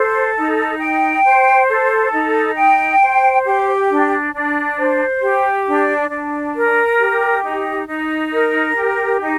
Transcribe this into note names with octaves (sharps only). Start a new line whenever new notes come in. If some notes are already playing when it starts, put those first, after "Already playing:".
Already playing: A4 C5
D#4
G5
C5
A4
D#4
G5
C5
G4
D4
D4
C5
G4
D4
D4
A#4
G4
D#4
D#4
A#4
G4
D#4